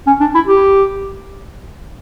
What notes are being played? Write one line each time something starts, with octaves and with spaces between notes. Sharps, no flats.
C#4
D4
E4
G4